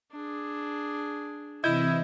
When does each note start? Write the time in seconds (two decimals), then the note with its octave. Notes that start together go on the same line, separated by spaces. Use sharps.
0.12 D4 G#4
1.64 C3 E3 C4 E4 D#5 G6 G#6